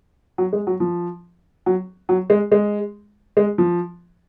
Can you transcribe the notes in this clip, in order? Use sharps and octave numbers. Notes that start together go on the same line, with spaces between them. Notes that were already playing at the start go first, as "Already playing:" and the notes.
F#3
G#3
F#3
F3
F#3
F#3
G#3
G#3
G#3
F3